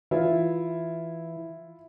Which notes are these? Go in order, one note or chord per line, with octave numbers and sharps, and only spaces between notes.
E3 E4 F4